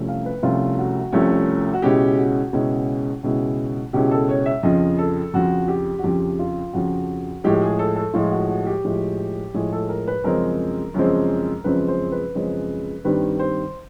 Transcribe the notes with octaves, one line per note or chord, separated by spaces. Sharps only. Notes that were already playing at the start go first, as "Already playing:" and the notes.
Already playing: C2 C3 F3 A3 C#4
F5
B4
C2 C3 F3 A3 C#4 F4
F#4
C2 C3 F3 A3 C#4
F#4
C#2 B2 G#3 C#4 E4 G4
F#4
C#2 B2 G#3 C#4 E4
C#2 B2 G#3 C#4 E4
C#2 B2 G#3 C#4 E4 G4
A4
C#5
E5
F2 C#3 F3 D#5
A4
F2 C#3 F3 F#4
G4
F#4
F2 C#3 F3 G4
F4
F2 C#3 F3 F#4
A2 F3 G#3 G4
G#4
A4
A4
A2 F3 G#3 F4
F#4
F#4
G4
A2 F3 G#3
A2 F3 G#3 G#4
A4
A#4
B4
F#2 C#3 F3 G#3 C4 A#4
F#2 C#3 F3 G#3 C4
F#2 C#3 F3 G#3 C4 B4
C5
B4
F#2 C#3 F3 G#3 C4
G2 D#3 G3 C4 B4
C5